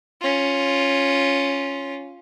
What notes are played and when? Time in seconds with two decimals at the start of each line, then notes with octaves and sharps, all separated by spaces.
0.21 C#4 F4